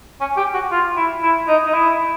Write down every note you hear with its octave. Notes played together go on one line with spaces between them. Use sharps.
C#4
G4
F#4
F4
E4
E4
D#4
D#4
E4